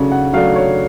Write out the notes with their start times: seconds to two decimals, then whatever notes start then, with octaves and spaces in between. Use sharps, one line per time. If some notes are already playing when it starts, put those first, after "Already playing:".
Already playing: C#3 F#3 A3 D4
0.12 F#5
0.33 F#3 A3 D4 F5
0.56 C#5